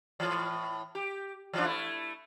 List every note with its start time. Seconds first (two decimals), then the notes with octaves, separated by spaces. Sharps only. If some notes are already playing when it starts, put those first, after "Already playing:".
0.20 A2 E3
0.95 G4
1.53 E3 F3 D4
1.65 A3 E4